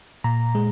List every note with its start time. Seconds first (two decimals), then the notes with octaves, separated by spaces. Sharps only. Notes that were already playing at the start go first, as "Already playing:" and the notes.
0.24 A#2 A#5
0.55 G#3